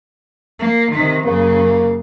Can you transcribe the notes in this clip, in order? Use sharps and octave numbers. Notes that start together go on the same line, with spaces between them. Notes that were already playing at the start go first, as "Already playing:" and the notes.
A#3
C3 D#3
F#2 C#3 A#3